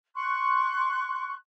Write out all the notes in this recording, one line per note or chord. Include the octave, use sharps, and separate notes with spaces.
C6 C#6 F#6